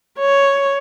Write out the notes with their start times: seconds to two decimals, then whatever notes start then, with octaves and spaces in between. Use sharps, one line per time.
0.19 C#5